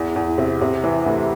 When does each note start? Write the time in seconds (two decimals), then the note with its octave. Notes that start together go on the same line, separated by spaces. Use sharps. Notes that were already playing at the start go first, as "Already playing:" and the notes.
Already playing: E2
0.16 E2
0.38 C3
0.61 C3
0.84 E3
1.06 D2